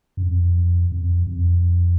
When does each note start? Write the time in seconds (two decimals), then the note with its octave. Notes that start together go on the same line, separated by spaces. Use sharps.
0.17 F#2
0.23 F2
0.92 F2
1.27 F2